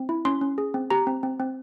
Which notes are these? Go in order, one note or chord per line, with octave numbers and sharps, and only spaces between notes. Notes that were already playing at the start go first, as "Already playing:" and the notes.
Already playing: C4
E4
C#4 C6
C#4
G#4
C4
G4 A#5
C4
C4
C4